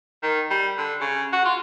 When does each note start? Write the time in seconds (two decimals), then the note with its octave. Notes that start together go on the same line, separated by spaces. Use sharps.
0.23 D#3
0.50 G3
0.78 D3
1.00 C#3
1.33 F#4
1.45 F4